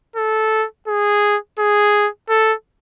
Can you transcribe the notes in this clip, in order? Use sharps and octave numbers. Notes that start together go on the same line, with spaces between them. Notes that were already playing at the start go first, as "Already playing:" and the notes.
A4
G#4
G#4
A4